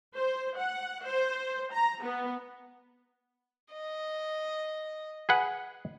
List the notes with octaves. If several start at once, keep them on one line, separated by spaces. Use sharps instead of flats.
C5
F#5
C5
A#5
B3
D#5
G#4 B4 F#5